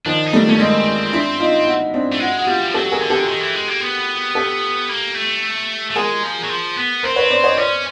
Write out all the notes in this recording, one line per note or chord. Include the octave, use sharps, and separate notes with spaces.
D#3 F3 D4
D#4
G3 A3 D4
A3 C#4
G#3 A#3 C4
D4 E4
D#4 F4
E4 F#4
C4 D4
A3
G#3 E4 F#4
F#4
G3 F4 G4
F3
F#3 G4 A4
G#4 A#4
D3
G4 A4
D#3
E3
G#3
A#3
B3
G4 A4
A#3
A3
A3
G#3 G#4 A#4
F3
F#3
F3
B3
C4 A#4 C5
B4 C#5
C5 D5
C#5 D#5
C#4 C5 D5